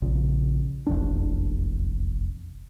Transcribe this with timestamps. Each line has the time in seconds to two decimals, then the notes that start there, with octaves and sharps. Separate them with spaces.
0.02 A#1 A#2 C#3
0.87 F1 A#1 E2 D4